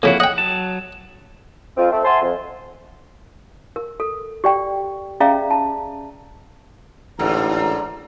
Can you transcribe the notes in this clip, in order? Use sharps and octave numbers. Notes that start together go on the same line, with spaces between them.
F2 C#3 A#3 E4 F#4
D#5 F#5 G5
F#3 A5
F2 C4 F4
A3 C4
E5 F#5 G#5 A5 C6
F2
A#4
A4
G4 D5 G5
C#4 G#4 D5 E5 F5 A#5
A5
A1 G#2 D3 A#5